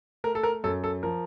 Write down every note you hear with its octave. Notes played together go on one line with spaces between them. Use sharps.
A3 A#4
A4
A#4
F#2 A4
A4
F3 A#4